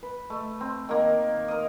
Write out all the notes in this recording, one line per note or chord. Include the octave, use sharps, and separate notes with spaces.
B4
A3
C4
D#3 A#3
A#4 D#5